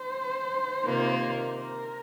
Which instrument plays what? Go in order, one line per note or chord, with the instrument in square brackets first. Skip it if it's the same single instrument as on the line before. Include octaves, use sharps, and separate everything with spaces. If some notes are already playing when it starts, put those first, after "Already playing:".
Already playing: [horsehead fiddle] C5
[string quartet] C3 D#3 A#3 F4
[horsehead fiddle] A#4